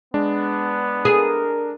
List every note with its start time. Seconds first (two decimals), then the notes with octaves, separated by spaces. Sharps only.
0.14 G#3 B3 D4
1.05 G#4 A#4